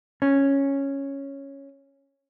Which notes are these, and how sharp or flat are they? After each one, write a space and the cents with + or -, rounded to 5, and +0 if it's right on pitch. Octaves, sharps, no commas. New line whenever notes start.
C#4 -5